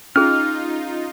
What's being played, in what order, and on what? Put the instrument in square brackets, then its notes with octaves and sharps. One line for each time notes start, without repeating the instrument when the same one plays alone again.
[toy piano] C#4 G#4 [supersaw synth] D#4 F4 [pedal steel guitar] F6